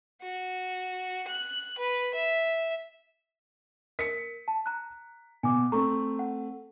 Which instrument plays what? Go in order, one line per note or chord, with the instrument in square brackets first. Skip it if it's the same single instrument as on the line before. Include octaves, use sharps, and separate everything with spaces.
[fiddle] F#4
F#6
B4
E5
[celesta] A#4 [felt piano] B6 C#7
[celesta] A5
A#5 F#6
[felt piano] B2 [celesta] G#5 D6
[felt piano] A3 C4 [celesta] A#5 C#6
[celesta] F#5